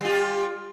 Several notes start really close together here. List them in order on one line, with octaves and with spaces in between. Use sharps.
G3 F4 G4